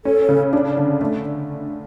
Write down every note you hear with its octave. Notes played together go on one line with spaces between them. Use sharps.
C#4 A4
C#3
D4
D3
A3 D5